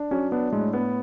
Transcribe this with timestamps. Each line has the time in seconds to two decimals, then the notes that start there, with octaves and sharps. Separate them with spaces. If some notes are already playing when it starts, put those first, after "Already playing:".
Already playing: D4
0.11 F#3 C#4
0.32 B3 D4
0.52 A2 G#3
0.73 B3